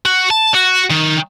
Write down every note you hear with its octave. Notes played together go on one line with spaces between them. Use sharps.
F#4
A5
F#4
D#3